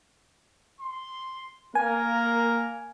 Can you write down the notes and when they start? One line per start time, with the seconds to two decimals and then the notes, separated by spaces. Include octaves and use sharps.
0.81 C6
1.75 A#3 A#4 G#5